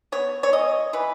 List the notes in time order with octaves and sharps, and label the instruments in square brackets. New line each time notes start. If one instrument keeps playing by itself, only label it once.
[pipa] B3 C#5
C#5
E3 D#5
E3 B4